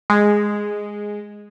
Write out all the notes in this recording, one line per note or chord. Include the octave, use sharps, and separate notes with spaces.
G#3